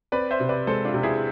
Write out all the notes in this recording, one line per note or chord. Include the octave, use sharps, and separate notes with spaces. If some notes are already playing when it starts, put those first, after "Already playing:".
C4 B4 D5
C5 E5
C3
B4 D5
G#3 A4 C5
D4 F4
C3
E4 G#4